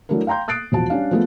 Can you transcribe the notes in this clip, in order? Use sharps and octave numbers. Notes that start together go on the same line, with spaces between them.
F#3 A3 D4 E4 A#4
F5 G5 A#5 C6 G6
D#6 F#6 A6 C7 D7
E1 F3 F#4 A5
G3 C#4 D4 F5
F3 G#3 A3 B3 F4